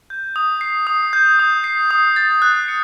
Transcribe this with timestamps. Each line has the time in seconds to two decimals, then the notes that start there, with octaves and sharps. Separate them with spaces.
0.10 G6
0.36 D#6
0.61 C7
0.87 D#6
1.13 G6
1.39 D#6
1.64 C7
1.91 D#6
2.16 A6
2.42 F#6
2.68 C#7